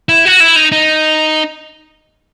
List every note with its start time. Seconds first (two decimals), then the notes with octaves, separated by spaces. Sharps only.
0.09 E4
0.25 F#4
0.40 E4
0.56 D#4
0.72 D#4